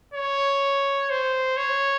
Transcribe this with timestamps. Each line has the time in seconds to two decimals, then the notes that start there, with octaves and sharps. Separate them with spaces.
0.14 C#5
1.10 C5
1.57 C#5